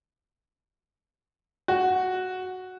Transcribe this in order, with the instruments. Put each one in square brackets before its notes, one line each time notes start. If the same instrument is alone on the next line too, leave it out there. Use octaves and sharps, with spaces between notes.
[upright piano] F#4